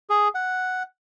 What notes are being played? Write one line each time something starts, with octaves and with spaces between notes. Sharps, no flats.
G#4
F#5